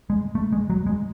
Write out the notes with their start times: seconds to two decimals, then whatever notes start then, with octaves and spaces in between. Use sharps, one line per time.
0.10 G#3
0.35 A3
0.52 G#3
0.70 F#3
0.87 G#3